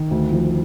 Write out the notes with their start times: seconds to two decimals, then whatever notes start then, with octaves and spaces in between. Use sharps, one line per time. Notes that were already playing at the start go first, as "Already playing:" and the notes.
Already playing: D#3
0.11 D2
0.32 F3